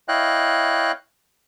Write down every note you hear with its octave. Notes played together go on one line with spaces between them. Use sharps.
E4 C#5 D#5 F5 G5 F#6